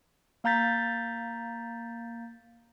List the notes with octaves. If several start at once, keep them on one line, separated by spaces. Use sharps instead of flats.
A#3 F5 A#5 G6 A6 B6